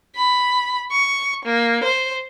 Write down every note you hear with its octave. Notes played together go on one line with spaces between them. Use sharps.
B5
C#6
A#3
C5